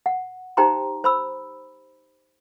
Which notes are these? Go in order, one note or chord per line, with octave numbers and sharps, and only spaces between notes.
F#5
D#4 G4 C5 G5 A#5 C6
C5 B5 E6